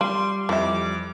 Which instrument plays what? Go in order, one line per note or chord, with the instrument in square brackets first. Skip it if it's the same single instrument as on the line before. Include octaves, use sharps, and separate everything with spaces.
[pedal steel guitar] G3 [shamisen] F4 [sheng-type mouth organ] C6
[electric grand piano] F2 [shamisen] E3 E5 [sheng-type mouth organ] D6